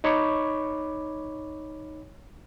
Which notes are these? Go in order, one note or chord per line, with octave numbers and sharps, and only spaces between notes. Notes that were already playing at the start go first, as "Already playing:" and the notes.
D#4 C#5 B5 C#6 D6